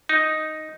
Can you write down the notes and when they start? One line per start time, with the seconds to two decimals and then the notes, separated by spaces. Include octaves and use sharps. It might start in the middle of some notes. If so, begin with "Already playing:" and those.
0.09 D#4